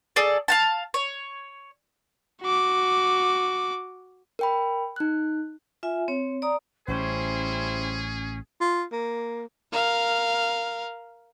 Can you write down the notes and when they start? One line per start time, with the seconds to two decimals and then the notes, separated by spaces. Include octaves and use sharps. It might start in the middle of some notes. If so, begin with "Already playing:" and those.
0.16 G#4 A4 D5
0.48 F5 F#5 A5
0.94 C#5
2.42 F#4 D6
4.39 A#4 G5 B5
4.96 D#4 F#6
5.83 F4 E5 G#5
6.08 C4 C#5
6.42 D5 A#5 D#6
6.88 A1 G3 C#4 E4 G#4 C5
8.61 F4
8.92 A#3
9.72 A#4 F5